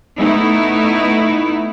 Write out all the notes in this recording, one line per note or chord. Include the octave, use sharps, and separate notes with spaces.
A3 B3 D#4 E4